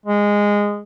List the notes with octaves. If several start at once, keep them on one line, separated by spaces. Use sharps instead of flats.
G#3